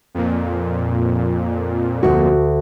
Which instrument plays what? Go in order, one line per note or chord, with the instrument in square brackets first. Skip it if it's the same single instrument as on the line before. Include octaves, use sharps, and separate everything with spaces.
[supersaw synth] F2 A#2
[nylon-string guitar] D2 F#4